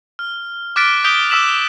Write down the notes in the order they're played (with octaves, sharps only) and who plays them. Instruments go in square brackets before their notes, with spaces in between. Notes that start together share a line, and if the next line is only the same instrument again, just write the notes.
[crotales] F6
D6 F6 F#6 A6 B6 D7
D#6 G6 B6 D7 G7
D6 E6 B6 E7 F#7